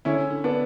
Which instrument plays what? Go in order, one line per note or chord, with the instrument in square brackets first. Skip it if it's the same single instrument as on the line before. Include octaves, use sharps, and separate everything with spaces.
[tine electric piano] D3 [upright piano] C#4 E4
[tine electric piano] D3
[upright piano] B3 D4